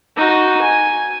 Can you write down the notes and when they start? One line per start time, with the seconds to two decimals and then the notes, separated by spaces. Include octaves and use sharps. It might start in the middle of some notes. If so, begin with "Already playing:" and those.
0.16 D#4 F#4
0.61 G#5